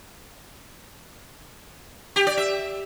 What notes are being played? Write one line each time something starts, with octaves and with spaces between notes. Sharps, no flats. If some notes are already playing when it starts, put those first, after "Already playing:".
G4
D5
E5